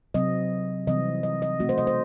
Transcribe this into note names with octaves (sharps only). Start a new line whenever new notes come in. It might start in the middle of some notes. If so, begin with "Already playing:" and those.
C3 F#3 C4 D#5
C3 E3 G3 C4 D#5
D#5
D#5
B2 A3 C4 F#4
C5
D#5
C5